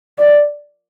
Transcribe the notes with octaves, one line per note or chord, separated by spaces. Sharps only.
D5